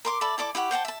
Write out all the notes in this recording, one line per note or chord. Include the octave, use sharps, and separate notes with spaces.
A#4 C6 D6
A4 D5 E5 B5
E4 A4 D5 D6
E4 G4 F#5 C#6
C5 F#5 G5 A5
E5 A5